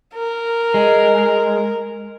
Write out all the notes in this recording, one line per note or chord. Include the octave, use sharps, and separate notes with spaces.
A#4
G#3